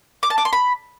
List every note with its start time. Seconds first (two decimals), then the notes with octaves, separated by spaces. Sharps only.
0.23 D6
0.30 A5
0.38 D6
0.45 C6
0.53 B5